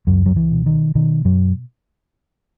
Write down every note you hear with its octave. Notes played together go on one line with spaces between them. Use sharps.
C#2 F#2 F#3
F#3
E3
B2
D#3
B2 D#3
F#2 F#3